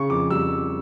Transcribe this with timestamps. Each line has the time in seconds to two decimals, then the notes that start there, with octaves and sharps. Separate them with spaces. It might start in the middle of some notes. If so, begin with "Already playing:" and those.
Already playing: C#3 C#6
0.10 F2 D6
0.30 G3 E6